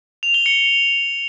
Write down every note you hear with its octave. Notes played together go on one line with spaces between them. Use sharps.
F7
G7
C#7